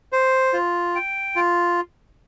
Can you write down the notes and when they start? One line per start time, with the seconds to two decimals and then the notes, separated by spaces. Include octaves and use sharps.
0.13 C5
0.53 F4
0.95 G5
1.36 F4